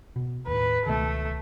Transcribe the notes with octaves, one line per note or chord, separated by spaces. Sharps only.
B2
D#2 A2 B4
C#2 B2 D#3 A3